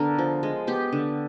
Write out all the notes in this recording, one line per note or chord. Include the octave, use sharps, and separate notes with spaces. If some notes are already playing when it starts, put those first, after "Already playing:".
Already playing: D3 B3 A#4
F3
G#3
B3 G4
D3